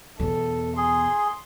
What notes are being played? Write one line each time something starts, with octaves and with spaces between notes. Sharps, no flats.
E2 B2 A4
G#4 C6